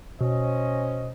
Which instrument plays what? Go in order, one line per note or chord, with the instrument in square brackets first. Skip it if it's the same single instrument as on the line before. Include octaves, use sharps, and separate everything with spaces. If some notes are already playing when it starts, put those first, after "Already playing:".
[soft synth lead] B2 [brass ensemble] C#4 C5 D#5